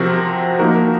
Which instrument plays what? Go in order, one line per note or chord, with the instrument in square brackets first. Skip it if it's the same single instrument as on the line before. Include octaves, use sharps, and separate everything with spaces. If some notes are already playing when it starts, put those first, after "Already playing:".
Already playing: [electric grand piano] C3 F3 C4 F#4 A#4
F3 A#3 D#4 F#4 A#4